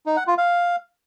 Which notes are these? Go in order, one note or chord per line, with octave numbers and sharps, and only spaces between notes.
D#4
F#5
F4
F5